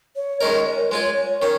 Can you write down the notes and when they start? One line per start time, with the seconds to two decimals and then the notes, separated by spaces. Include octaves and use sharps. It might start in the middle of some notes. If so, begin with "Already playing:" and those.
0.16 C#5
0.41 D#3 G#3 C#4 A#4 D#5
0.54 D#5
0.67 C#5
0.78 A#4
0.91 G#3 F4 G#4 C#5
1.04 C#5
1.17 C#5
1.29 C#5
1.42 D#3 C#4 C#5